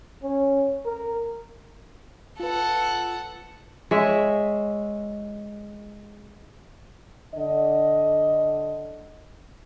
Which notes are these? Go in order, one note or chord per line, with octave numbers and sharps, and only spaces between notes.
C#4
A#4
F4 A4 B4 F#5
G#3 C#5 E5
D3 D#5